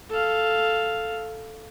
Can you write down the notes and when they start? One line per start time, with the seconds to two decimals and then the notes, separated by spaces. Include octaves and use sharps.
0.10 A4 F5